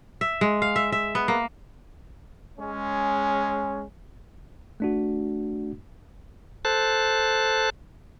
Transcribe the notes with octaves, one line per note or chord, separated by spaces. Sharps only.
E5
G#3
F5
E5
E5
B3
A#3
G#3 C#4
A3 D4 F#4
A4 C5 A5 F#6